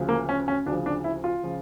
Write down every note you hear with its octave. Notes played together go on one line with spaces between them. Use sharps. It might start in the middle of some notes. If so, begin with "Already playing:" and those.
Already playing: D2 C#3 F3
A#3
C#4
C#4
D2 C#3 F3 D4
D4
E4
F4
C#3 F3